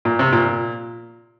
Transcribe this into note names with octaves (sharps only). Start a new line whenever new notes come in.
A#2
C3
A#2